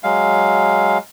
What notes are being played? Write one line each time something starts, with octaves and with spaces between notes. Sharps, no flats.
F#3 G#3 F5